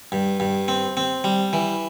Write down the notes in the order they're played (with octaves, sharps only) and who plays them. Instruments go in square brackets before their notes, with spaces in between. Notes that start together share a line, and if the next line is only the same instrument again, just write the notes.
[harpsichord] G2
G2
C4
C4
G3
E3